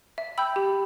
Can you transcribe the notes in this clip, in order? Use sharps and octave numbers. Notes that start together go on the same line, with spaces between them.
E5
G5 B5 E6 G6
G4